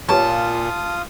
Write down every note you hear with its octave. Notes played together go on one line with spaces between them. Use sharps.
A#2 B3 C#4 F4 G4 F5 A5 D#6